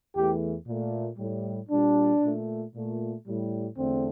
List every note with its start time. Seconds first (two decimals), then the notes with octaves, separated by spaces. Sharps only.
0.14 E2 E3 A3 G4
0.67 A#2 A3
1.18 A2 G3
1.69 A#2 G3 D4
2.22 A#2 A3
2.74 A#2 A3
3.26 A2 G3
3.77 E2 D3 A3 C4